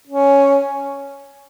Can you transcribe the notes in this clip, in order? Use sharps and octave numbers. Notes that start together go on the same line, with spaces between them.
C#4